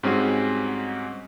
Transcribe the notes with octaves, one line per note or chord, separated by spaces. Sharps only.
G#2 G3 C4 C#4 F#4 G#4